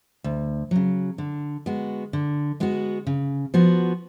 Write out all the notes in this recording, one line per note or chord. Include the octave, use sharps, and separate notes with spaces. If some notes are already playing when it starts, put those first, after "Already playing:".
D2
C#3 F#3
D3
G#3 B3 F#4
D3
G#3 B3 F#4
C#3
F3 B3 F#4